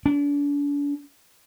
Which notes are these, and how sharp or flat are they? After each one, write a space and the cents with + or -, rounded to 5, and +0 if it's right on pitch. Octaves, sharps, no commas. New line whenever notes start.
D4 -40